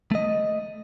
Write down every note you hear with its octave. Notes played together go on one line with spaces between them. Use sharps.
A3 D#5